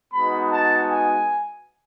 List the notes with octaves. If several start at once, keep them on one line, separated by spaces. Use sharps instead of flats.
G#3 B3 D#4 F#4 B5
A5
G#5